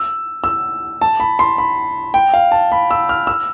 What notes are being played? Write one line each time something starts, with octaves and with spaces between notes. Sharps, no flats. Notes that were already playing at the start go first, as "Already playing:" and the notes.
Already playing: E6
E6
A5
B5
C6
B5
G5
F5
A5
B5
E6
F6
E6